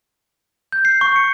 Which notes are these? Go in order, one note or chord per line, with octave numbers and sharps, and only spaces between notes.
G6
C7
C#6
C#7